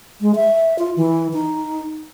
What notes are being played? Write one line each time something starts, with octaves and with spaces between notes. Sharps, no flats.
G#3
E5
F4
E3
D#4